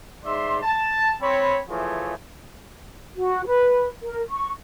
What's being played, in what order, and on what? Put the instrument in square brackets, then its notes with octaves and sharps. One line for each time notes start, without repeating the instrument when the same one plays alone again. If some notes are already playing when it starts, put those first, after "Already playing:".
[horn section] G#2 D5 E5 C6
A5
C4 C#5 B5
E3 F3 A3 F4 G#4 C#5
[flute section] F#4
B4
A#4
C#6